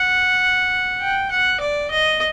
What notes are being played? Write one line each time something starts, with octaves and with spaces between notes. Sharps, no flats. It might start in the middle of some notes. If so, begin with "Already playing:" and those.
Already playing: F#5
G5
F#5
D5
D#5